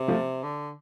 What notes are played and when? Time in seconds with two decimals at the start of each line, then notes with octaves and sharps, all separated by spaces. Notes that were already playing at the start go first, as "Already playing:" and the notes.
Already playing: C3
0.08 F3 A3
0.43 D3